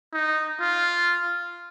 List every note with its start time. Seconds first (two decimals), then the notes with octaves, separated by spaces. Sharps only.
0.13 D#4
0.60 F4